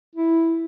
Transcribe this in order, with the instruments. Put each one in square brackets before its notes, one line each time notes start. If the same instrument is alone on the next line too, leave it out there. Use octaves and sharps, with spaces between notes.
[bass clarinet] E4